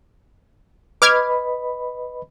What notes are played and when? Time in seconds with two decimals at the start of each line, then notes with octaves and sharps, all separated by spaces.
1.02 B4 D#5 B5 D6 F6 G#6